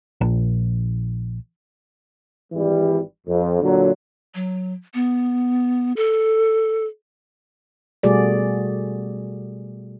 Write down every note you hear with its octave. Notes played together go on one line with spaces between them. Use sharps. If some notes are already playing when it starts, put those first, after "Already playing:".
A#1
G#1 E3 G3
F2
A#2 D3 F#3
F#3
B3
A4
B2 G3 A3 F#4 G#4 D5